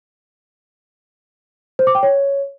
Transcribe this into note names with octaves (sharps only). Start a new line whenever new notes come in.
C5
D6
G5
C#5